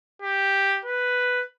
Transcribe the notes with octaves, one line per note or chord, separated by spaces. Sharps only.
G4
B4